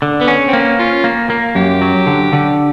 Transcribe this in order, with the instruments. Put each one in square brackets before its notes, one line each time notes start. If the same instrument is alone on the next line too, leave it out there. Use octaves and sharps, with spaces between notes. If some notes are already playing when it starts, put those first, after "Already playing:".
[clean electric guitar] D3
[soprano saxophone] B3
[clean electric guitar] C#4
[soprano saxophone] C4
[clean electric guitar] A#3
[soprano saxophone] C#4
[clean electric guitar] C#4 [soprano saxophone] F4
[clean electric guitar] A#3
A#3
[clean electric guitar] F#2 [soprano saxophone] G4
[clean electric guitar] F#3
D3
D3